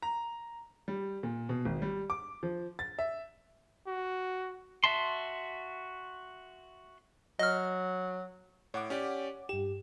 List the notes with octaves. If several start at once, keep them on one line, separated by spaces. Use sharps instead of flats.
A#5
G3
A#2
B2
G#1
G3
D6
F3
A6
E5
F#4
F#4 E5 A5 C6
F#3 D#5 F6
A2 C#5 F#5 D6
C#4 G4 D5
G2 G4 E7